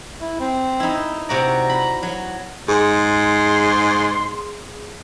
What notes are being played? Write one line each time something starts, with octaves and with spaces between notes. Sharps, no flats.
E4
C4
D#4 E4
C3 F#4 D5 A#5
B5
F#3
G#2 G#4 C6